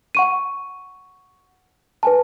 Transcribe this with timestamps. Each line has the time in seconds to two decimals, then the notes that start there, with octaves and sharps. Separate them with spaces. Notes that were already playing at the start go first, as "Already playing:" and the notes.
0.15 F#5 C#6 D#7
2.03 B4 G#5 A5